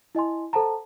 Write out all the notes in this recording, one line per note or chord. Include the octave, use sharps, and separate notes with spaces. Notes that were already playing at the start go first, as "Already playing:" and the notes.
E4 D#5 G#5 C6
A4 C5 F#5 A5 A#5